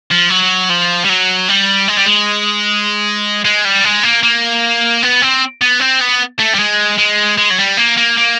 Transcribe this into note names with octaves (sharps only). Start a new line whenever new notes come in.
F3
F#3
F3
G3
F#3
G3
G#3
G3
G#3
G#3
G3
G#3
A#3
A#3
B3
C4
B3
C4
B3
A3
G3
G#3
G#3
G#3
F#3
G3
A#3
A#3
A#3